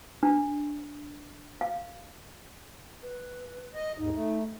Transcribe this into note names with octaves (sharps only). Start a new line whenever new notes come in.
D4
F5
B4
D#5
D#2 G#2 D#4
A3